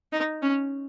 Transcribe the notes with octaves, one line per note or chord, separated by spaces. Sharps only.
D#4
C#4